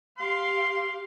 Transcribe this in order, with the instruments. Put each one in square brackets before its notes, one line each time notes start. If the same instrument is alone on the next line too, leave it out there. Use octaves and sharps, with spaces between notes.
[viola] G4 F5 [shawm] C6